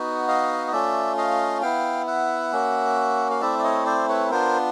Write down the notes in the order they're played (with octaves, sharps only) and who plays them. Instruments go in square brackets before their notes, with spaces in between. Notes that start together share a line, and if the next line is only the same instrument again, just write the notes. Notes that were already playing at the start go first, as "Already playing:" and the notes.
Already playing: [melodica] B3 D#4 F#4
D#5 F5
D#5
A3 C#4 F4 D5 E5
D#5 F5
B3 E4 F5 G5
E5 F#5
A#3 C#4 F#4
F5
A3 C4 E4 D5 E5
D5
C#5 D#5
C5 D5
B4 C#5
B3 D4 F4 A#4 C5